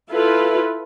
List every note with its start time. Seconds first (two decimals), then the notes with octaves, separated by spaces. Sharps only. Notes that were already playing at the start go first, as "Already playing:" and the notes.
0.11 E4 F4 A4 B4